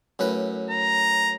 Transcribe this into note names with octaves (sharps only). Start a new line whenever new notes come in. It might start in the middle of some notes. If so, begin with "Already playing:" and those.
F#2 A2 B4
A#5